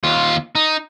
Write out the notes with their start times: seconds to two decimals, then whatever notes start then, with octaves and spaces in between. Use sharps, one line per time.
0.04 D#2 F4
0.55 D#4